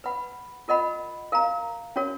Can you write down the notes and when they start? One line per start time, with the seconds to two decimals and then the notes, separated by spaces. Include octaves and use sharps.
0.04 B4 F#5 B5
0.68 F4 A#4 D#5 F#5 B5
1.32 A#4 F5 A#5
1.96 C#4 F#4 A#4 C#5